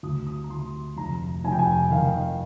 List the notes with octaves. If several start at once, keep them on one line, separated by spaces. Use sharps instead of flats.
D2 D#6
D#6
A#5
D2 C6
F1 A#5
F1 G#5
G5
G#5
D#3 F5
D#5